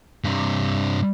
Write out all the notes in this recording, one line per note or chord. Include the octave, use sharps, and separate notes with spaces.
G2 C3